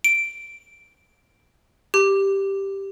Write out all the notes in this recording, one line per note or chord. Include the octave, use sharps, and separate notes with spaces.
D7
G4